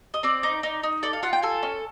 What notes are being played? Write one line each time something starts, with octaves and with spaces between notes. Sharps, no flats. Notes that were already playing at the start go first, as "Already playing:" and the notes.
D#5
C4 D5
D#4
D#4
D#4
A4 D5
F5
F4 F#5
G5
A4 G#5
C#4